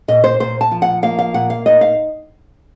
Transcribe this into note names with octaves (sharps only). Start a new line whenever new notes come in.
A#2 D#5
C5
A#2 C5
A5
F3
F#5
A#3 F5
F5
A#2 F#5
F5
D#4 D#5
F5